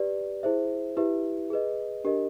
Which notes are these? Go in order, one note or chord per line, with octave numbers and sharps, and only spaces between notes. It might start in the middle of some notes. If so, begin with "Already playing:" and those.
Already playing: G4 B4 D5
E4 G#4 C5 E5
E4 G4 B4 E5
G#4 B4 D#5
D4 G4 A#4 D#5